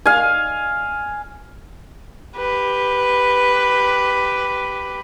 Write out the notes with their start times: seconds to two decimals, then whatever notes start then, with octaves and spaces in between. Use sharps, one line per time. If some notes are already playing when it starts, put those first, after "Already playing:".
0.06 F5 G#5
2.37 G4 B4